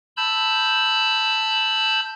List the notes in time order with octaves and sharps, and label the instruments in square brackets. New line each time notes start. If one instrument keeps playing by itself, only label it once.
[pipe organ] A5 B5 E6 G6